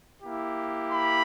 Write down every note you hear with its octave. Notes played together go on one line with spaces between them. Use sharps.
A#3 E4 G4
B5